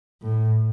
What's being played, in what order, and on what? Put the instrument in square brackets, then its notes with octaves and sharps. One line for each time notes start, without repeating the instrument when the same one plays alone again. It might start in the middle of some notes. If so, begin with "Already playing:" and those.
[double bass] A2